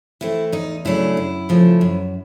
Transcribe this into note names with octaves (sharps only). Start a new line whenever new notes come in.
E3 A3 C4 E4
E2 D#4
C#3 F#3 A3 D4 E4
F#2
C#3 F3 A3
F#2